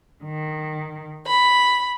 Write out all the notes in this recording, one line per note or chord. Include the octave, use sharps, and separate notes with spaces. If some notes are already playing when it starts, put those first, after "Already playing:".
D#3
B5